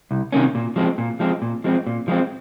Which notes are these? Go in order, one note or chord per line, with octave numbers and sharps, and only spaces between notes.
C2
C3 D#3 A#3 C#4
A#2
F3 G#3 C4
A#2
F3 G#3 C4
A#2
F3 G#3 C4
A#2
F3 G#3 C4